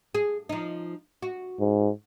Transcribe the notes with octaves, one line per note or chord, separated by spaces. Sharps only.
G#4
F3 D#4
F#4
G#2